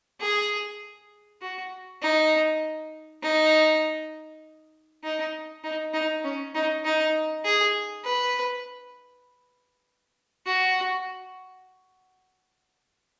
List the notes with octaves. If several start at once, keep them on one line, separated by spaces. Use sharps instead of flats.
G#4
F#4
D#4
D#4
D#4
D#4
D#4
C#4
D#4
D#4
G#4
B4
F#4